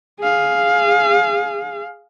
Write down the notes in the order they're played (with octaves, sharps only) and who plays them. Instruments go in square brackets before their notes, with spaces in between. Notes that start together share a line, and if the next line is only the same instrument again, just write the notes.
[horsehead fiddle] G#4 F5